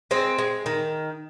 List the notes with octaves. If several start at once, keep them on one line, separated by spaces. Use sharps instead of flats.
G#3 C4
G#3
D#3